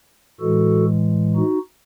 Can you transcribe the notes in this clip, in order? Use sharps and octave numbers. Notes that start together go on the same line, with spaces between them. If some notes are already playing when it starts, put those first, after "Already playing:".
A2 E3 G#3 F#4 A4
D#4 F#4